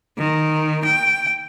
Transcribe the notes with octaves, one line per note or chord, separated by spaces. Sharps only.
D#3
G5